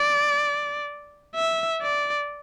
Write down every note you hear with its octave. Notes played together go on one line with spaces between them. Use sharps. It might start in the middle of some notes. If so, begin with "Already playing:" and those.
Already playing: D5
E5
D5